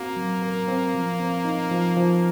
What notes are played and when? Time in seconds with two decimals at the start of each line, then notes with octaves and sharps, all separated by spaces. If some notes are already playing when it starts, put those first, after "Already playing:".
Already playing: A#3 C4 F#4 A#4
0.16 F#3
0.42 A#4
0.68 C4
0.94 F3
1.19 C4
1.45 D#4
1.71 F3
1.97 F3